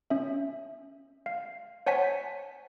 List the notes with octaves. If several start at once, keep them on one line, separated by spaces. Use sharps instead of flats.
C#4 E5
F5
C5 C#5 F#5 G#5 A5 B6